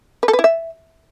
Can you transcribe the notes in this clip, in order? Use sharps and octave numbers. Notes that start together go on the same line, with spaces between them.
B4
A4
B4
E4
E5